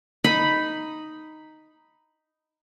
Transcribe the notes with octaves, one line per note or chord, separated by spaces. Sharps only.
D#4 B5